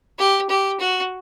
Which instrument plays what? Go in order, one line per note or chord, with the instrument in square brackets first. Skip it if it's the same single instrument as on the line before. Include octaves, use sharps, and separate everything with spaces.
[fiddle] G4
G4
F#4